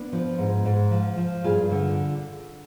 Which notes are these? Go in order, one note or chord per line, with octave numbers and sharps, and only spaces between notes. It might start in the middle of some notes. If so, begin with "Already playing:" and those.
Already playing: B3 D4
F3
G#2
G#2
F3
F3
G2 F4 G#4
D3